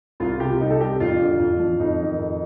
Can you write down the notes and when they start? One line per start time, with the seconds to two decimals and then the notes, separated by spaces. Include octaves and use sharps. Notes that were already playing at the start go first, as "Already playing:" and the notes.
0.20 C2 F4
0.32 F4
0.40 C3 G4
0.60 C2 D#4
0.70 A4
0.80 G3 G4
1.00 F2 F4
1.21 D3
1.39 F2
1.59 F3
1.79 F2 D#4
2.00 D#3
2.20 F2